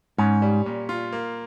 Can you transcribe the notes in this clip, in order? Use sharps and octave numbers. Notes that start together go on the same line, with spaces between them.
G#2 C#4
G3
A#2
F4
A#3